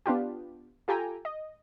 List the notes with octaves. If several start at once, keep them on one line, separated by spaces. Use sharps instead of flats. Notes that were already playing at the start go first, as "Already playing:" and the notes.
B3 D4 F4 G4
F4 G4 A4 G5 G#5 A#5
D#5